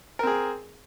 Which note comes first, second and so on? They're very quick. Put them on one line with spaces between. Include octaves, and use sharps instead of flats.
A#4 C4 G#4